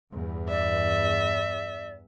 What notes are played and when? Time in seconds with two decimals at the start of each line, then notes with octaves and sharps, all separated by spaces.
0.12 E2 G2
0.49 D5 E5